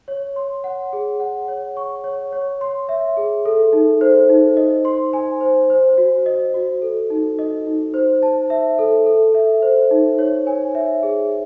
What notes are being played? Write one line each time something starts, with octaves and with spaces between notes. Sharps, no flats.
C#5
C6
F#5
G#4
F#5
C#5
C#6
C#5
C#5
C6
E5
G#4
A4
D#4
C5
D#4
D#5
C6
G#5
C5
C5
F#4
D#5
F#4
A4
D#4
D#5
D#4
C5
A5
E5
A4
A4
E5
C5
D#4
C#5
G#5
E5
G#4